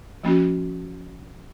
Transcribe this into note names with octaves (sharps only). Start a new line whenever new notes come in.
F3 A#3 C#4 F#4